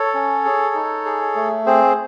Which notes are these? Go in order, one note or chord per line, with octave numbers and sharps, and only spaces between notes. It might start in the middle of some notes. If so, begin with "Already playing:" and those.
Already playing: A4 C#5
C#4
G#4
D#4
G#4
A3
C4 G#4 C5